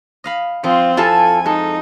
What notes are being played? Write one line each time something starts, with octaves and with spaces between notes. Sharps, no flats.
D#5 F5 B5
F3 C4 F4
F2 E4 F4 A4 G#5 A5
G#3 D#4 A4